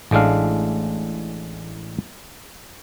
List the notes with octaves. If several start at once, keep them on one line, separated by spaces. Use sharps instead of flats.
A1 A2 G#3 D4 F5